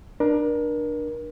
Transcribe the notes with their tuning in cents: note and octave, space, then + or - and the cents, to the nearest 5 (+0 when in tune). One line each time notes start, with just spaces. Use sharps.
D4 +20 A#4 +30